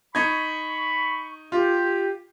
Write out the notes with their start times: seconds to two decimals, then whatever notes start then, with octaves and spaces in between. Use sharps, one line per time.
0.15 D#4 B5 C#6 G#6
1.52 F4 G4